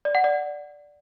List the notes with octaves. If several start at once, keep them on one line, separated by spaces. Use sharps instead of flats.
D5
F#5
D5